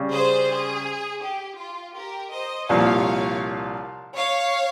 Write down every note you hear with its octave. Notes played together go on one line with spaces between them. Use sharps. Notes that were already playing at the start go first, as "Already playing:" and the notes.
Already playing: C#3 G3 C#4
G#4 C5
G#4
G4
F4
G4 A#4
C5 D#5
C2 A#2 F3 C#5 F5
C#5 F5